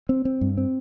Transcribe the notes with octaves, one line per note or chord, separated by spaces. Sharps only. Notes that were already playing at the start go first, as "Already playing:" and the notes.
C4
C4
G2
C4